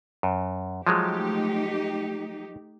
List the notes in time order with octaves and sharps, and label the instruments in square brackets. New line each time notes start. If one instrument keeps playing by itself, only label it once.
[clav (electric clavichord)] F#2
[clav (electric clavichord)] F3 F#3 G#3 [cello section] A3 D#4 G4